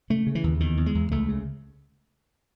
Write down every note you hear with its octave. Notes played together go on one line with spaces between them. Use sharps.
C#3 A3
C#3
E3
D#2
E2 D#3
E2
G#3
E2
C#2 A3
C#3